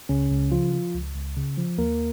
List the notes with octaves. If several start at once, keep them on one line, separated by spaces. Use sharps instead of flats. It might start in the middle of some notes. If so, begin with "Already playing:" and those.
C#2 C#3 C#4
C#2
C#3 F3 F4
F3
C#2
C#2
C#3
F3
D#2 A#3 A#4